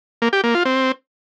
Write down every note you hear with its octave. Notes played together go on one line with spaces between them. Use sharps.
A#3
G4
A#3
F4
C4